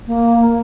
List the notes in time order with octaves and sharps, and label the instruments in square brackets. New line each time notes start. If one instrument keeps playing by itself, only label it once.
[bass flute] A#3